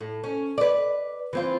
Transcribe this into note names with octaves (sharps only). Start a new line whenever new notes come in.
A2
C#4
B4 D5
E3 C4 F4